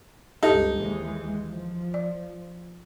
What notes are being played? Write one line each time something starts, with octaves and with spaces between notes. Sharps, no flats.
C#2 G2 D#4 G4 A4 A5
D#2 E3 G#3
F3
D5